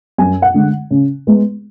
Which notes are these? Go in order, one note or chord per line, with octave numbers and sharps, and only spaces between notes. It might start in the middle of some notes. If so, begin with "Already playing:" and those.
F#2 G#5
F#5
D3 G#3
C#3
G#3 B3